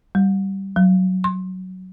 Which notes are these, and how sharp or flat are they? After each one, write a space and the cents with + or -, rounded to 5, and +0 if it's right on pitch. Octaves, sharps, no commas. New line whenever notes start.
G3 -10
F#3 +5
C6 +25